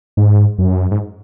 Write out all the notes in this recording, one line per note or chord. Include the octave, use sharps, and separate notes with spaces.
G#2
F#2
G#2